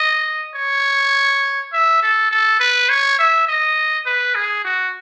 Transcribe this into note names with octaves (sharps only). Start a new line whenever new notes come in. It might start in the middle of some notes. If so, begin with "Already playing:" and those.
Already playing: D#5
C#5
E5
A4
A4
B4
C#5
E5
D#5
B4
G#4
F#4